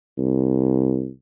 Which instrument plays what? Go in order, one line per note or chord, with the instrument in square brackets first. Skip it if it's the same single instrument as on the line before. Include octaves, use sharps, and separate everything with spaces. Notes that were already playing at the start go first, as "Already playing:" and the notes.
[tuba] C2